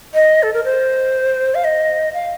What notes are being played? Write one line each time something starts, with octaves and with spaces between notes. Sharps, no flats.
D#5
A4
A#4
C5
F5
D#5
F5